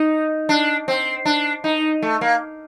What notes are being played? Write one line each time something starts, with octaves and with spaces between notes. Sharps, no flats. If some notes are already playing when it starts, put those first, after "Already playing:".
Already playing: D#4
D4
C4
D4
D#4
A3
A#3